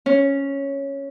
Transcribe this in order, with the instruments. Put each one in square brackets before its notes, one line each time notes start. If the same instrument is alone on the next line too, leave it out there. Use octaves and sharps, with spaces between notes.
[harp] C#4